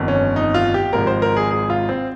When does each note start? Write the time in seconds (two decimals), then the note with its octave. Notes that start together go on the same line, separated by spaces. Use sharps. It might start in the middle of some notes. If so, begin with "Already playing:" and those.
Already playing: G1 F2 D#3
0.08 C#4
0.36 D#4
0.54 F4
0.74 G4
0.93 G#1 G#2 F3 A#4
1.07 C5
1.22 A#4
1.36 G#4
1.51 G#4
1.70 F4
1.89 C4